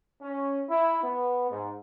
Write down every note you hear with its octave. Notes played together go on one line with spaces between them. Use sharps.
C#4
E4
B3
G#2